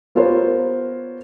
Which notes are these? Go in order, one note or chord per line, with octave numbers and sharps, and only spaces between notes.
B3 F4 G4 A#4 C5 C#5